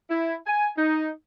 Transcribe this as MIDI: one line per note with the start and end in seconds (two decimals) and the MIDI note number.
0.10 0.35 64
0.46 0.69 80
0.77 1.10 63